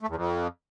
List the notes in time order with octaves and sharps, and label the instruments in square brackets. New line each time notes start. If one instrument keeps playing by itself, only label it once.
[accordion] A3
E2
F2